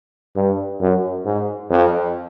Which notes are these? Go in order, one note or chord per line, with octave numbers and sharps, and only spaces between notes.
G2
F#2
G#2
F2